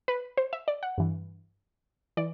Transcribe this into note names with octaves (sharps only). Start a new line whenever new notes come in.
B4
C5
E5
D5
F#5
G2 E3
E3 D5